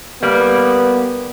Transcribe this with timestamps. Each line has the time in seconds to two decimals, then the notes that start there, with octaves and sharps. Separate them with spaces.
0.23 G3 A#3 B3